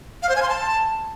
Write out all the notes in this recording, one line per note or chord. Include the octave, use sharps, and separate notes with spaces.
F5
C5
G#5
C6
A5